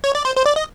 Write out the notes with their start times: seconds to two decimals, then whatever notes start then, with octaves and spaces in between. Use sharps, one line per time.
0.04 C#5
0.15 D5
0.25 C5
0.36 C5
0.46 D5
0.56 D#5